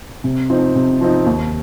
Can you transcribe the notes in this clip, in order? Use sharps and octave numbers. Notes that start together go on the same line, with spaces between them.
C3
F3 C4 D#4
C3
F3 C4 D#4
D#2